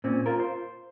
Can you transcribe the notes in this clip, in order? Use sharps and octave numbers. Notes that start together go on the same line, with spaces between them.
A#2 C4 C#4
F4 A#4
C5